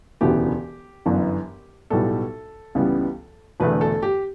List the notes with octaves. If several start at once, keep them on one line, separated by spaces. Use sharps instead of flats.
E1 D2 C#3 E3 B3 G4
G1 F#2 E3 B3 D4
B1 A2 G3 B3 A4
C#2 C#3 E3 G3 B3
E1 E2 D3 A3 B4
A4
G4